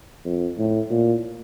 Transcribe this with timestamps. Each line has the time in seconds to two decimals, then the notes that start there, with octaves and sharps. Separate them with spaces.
0.25 F2
0.58 A2
0.90 A#2